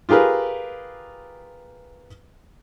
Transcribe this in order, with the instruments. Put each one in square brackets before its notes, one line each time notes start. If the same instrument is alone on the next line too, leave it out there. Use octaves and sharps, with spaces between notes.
[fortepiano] F4 G4 G#4 A#4 B4